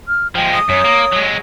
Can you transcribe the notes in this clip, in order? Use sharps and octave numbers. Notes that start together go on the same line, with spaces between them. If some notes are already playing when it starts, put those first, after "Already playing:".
F6
F3 G#3 G5
D#6
F#2 C#5
A#3
F#3 G#3